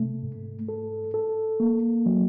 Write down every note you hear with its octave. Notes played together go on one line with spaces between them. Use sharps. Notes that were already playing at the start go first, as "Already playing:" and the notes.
Already playing: C3 A3
G#2
A4
A4
A#3
F#3